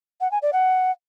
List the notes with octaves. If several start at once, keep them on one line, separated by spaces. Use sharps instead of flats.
F#5
G#5
D5
F#5